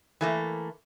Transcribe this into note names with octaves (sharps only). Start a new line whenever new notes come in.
E3 A3 A#3